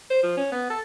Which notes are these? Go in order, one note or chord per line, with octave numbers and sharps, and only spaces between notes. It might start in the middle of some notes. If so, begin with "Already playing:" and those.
C5
F3
C#4
B3
A4